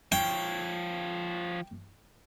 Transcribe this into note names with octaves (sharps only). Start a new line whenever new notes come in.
F3 C#5 G5